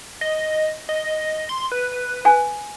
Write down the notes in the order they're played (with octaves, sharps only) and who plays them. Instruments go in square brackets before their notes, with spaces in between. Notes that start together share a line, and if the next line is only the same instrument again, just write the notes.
[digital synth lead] D#5
D#5
C6
B4
[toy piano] G#5